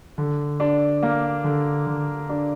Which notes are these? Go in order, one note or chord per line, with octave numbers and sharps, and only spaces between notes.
D3
D4
A#3
D3
D3
D4